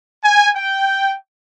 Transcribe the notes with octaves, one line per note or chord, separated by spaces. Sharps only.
G#5
G5